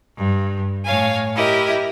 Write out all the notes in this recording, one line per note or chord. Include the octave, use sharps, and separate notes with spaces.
G2
A2 C#5 F5 G#5
E4 G4 A#4 D#5